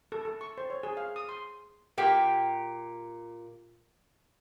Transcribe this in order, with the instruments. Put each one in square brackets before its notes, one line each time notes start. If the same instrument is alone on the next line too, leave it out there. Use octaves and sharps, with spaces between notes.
[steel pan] A4
A4
C#6
C5
C#5
G#4
F5
D#6
C6
[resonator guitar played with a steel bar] A#2 G4 G5